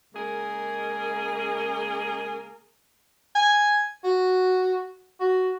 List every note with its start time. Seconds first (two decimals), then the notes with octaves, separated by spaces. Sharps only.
0.14 C#3 G#3 A#3 G#4 A#4
3.35 G#5
4.04 F#4
5.20 F#4